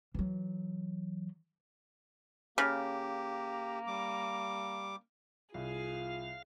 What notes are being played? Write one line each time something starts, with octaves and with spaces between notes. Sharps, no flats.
E3 F#3
C#3 A#3 G4
G3 D6
C2 F4 G#4 F5